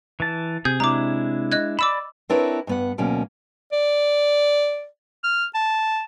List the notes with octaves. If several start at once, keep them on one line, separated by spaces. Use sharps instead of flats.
E3 A5
C3 G#4 G6
G#3 D4 E4 A#5 D6
D#5 F#6 G#6
D5 B5 D6 E6 E7
C4 D4 E4 A#4 B4 C#5
G2 B3 F#5
D2 B2 F#3 A#3 C#4
D5
F6
A5